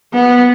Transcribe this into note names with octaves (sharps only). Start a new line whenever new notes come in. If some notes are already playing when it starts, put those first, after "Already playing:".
B3